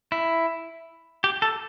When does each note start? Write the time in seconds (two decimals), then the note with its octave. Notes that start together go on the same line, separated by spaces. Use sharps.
0.12 E4
1.24 G4
1.42 A4